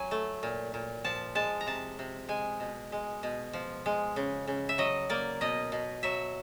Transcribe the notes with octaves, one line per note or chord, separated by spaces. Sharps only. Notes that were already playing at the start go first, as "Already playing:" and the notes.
Already playing: F#3 G#5
A3
A#2
A#2
F3 A5
G#3 A5
A#5
C3 A5
C3
G#3 G#5
B2
G#3
B2
F3
G#3
C#3
C#3
E5
F#3 D#5
A#3 D5
B2 D#5
B2
F#3 E5